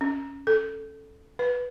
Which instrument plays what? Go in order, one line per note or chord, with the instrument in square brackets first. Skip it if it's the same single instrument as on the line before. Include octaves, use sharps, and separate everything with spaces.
[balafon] C#4
A4
B4